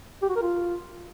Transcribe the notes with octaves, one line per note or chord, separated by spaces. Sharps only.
G4
F#4
A#4
F4